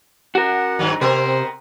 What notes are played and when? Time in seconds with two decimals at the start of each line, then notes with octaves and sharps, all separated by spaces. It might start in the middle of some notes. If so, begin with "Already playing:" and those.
0.35 F#4 A#4 F#5
0.79 G2 D#3 F#3
1.01 C3 B3 C4 A#4 C5